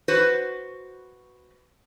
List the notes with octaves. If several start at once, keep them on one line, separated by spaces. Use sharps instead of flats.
F#4 B4 C5